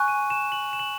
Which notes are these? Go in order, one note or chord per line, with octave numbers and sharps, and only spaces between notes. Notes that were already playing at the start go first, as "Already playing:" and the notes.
Already playing: G#5 C#6 F#6
D#7
E7
F#7
E7
F#7